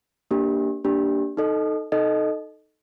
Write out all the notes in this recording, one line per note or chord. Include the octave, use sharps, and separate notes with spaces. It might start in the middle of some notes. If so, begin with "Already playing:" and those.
A#3 D4 G4
A#3 D4 G4
D#4 A4 D#5
D#4 A4 D#5